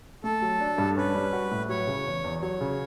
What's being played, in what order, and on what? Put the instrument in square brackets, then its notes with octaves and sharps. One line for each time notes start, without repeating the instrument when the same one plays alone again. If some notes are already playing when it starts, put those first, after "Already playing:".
[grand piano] A3 [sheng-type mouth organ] A4
[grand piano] F#3
D4
G2
[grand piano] C#4 [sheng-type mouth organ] B4
[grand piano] G3
F#4
A2
[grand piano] F#3 [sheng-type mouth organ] C#5
[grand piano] C#3
E2
E2
[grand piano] F#3 [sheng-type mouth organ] C#5
[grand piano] C#3